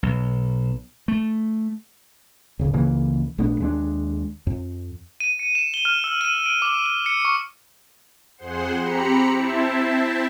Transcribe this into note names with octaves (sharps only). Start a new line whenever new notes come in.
B1
A3
D1 C#3
C#2 C#3 E3 A#3
A#1 A3 B3 D4
D#2 G#3 D4
F2
D#7
C#7
E7
G7
F6
E6
D#7
D7
D6
G7
C#7
C#6
F2 G#4 C5 F#5 C6
C4 G4 A#5 B5 C#7
C4 E4 C5 E5 A5